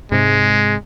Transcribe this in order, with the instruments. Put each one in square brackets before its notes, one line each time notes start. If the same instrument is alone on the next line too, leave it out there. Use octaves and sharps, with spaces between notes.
[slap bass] G#2 C3 [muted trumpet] G#3